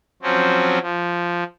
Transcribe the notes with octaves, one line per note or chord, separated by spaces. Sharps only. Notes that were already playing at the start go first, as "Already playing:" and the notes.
F3 F#3 C4 C#4
F3